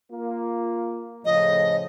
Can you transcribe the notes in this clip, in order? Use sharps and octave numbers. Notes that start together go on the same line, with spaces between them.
A#3 F4
A2 C#3 F3 D#5